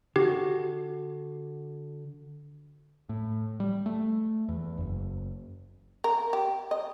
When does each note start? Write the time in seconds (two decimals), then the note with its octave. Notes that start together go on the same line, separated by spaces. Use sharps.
0.16 D3 F#4 G4
3.09 A2
3.60 G3
3.86 A3
4.49 E2
4.78 F#1
6.04 A#4
6.33 G4
6.71 D#5